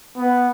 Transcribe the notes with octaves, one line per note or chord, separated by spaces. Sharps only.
B3